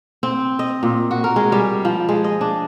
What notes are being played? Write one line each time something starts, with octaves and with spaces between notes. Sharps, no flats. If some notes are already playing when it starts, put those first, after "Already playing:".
C4
D#5
A#2
F#4
A#4
G#3
G3
F3
G#3
D#5
D4